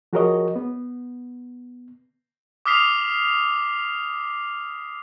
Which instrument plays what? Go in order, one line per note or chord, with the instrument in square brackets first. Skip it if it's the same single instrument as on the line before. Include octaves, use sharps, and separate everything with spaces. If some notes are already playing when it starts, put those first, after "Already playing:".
[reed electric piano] F3 F#4 G#4 A#4 C#5 D#5
B3
[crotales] D6 D#6 F6 B6 C7 F7